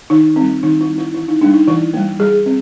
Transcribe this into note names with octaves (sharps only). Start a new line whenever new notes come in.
D#3 D#4
G3 C4
D#3 D#4
E4
G3 C4
E4
E3 E4
D#4
G3 A#3 D4
D#4
E3 E4
G3 A#3
G3 G#4
C4